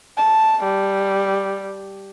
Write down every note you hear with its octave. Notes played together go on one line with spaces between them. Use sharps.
A5
G3